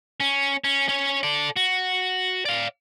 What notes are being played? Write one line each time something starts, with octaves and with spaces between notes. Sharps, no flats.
C#4
C#4
C#4 C#5
A4 D5
F#4
D5 F5